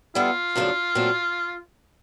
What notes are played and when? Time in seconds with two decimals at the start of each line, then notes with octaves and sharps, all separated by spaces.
0.15 G3 B3 E4 F4 A4
0.55 F#2 C#3 F3 A3 D4
0.95 A#2 F#3 A3 C4